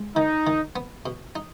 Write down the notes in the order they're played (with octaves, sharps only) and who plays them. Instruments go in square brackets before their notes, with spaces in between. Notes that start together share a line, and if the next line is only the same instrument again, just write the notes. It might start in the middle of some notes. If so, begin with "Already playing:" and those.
Already playing: [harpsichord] G#3
[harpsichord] D#3 [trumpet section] D#4
[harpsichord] D#3
B3
B2
D#4